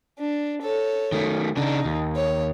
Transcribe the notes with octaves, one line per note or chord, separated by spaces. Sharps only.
D4
A4 C#5
D#3 A3
C#3 D4 D#4
D#2
C#5